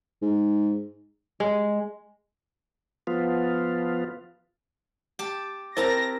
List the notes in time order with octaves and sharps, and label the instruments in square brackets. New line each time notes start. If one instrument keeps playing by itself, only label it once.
[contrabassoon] G#2
[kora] G#3
[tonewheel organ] F3 B3 F4
[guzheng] G4 A5
[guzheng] C4 A5 A#5 [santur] E4 A#4 [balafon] C5 [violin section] A#6